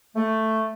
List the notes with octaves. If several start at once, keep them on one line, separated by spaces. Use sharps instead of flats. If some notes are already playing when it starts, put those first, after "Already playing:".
A3